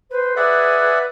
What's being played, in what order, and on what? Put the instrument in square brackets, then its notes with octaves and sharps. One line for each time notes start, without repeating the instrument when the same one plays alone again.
[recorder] B4 [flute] C5
[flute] G#4 [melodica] D5 E5 F#5